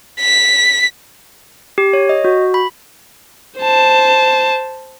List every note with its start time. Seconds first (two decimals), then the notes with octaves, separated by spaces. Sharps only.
0.21 B6
1.78 G4
1.93 C#5
2.09 D#5
2.25 F#4
2.54 B5
3.59 C5 A5